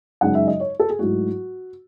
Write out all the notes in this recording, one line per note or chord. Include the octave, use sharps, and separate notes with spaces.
F#2 C#3 G#3 D#4 F#5
E5
D#5
C#5
A4
G#4
G#2 F#3 A3 E4 F#4